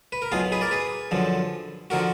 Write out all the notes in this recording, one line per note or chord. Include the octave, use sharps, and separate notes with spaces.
B4
A#4
B1 B2 F4 G#4
G#4 B4
A#4 D5
G#4 B4
F#2 D3 F3
D3 F3 F#4 A#4